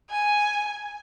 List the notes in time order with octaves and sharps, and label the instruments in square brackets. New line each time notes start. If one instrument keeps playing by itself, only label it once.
[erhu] G#5